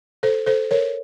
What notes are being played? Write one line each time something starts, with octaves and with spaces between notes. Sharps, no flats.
A4 C5
A4 C5
A#4 C#5